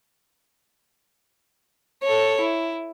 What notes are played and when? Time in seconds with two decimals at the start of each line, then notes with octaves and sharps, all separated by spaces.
2.03 A4 C#5
2.40 E4